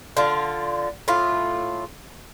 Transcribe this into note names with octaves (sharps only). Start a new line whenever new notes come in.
D3 F4
A2 A3 F4